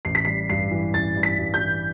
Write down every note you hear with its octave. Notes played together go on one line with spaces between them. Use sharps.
A1 C7
B6
G3 C7
G2 C7
E3
A1 A6
G3
B6
G2
G6
E3